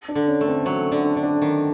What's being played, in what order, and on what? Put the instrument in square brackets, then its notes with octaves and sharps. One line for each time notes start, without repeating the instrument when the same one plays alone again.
[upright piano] D4
[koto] D3
[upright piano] C#4
[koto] A3
[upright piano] C4
[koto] F#3 [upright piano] C4
[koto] D3
[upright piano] D4
[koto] D3
[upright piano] D4
[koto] D#3